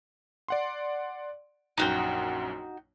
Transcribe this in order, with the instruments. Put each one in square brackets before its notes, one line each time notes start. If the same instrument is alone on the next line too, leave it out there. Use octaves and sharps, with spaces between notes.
[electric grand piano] D5 F#5 C6
[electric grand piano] A#1 F#2 [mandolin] D#4 F#4 G5